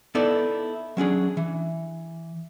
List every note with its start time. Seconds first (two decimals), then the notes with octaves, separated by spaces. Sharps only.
0.15 B3 D#4 E4 A4 D5
0.97 F#3 C#4 D4 G#4
1.37 E3